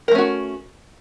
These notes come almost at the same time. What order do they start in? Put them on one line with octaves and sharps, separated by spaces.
A#4 A3 C#4 F#4